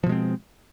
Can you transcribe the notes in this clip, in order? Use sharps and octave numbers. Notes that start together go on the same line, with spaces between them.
B2 F3 G#3 C4